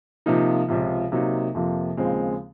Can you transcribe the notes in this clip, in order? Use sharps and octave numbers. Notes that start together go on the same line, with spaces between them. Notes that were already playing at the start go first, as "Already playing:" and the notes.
C3 F3 A#3 D#4
C#2 C3 F3
C3 F#3 A#3 D#4
F2 C3 F3 A#3
D#2 C#3 F3 G#3 C4